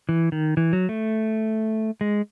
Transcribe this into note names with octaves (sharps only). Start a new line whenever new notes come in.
E3
D#3
E3
F#3
A3
G#3